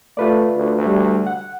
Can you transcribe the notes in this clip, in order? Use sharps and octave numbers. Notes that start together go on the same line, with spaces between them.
A3 F4 B4 D5
D2
G3
F#5